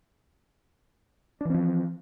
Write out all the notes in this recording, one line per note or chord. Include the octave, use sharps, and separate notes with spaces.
E3 F3 C4 D4